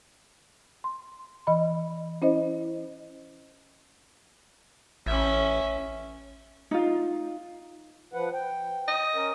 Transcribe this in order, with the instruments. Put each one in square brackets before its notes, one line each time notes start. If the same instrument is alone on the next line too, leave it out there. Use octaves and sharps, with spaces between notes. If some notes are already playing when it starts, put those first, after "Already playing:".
[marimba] C6
E3 D#5 B5
C#4 E4 C5 D#5
[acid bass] A1 [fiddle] C#4 E5
[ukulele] D#4 F4
[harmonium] F3 B4 F#5
G5
[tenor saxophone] D#5
[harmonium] C#4 A#4